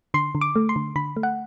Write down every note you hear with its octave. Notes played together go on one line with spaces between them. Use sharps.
D3 C6
D3
D6
A3
C6
D3
D3 B5
A3
F#5